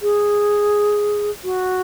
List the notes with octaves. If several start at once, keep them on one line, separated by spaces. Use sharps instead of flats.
G#4
F#4